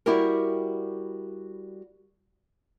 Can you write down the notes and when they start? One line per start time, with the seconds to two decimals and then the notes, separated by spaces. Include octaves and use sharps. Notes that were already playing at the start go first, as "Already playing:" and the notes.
0.06 G3 E4 F#4 G4 A#4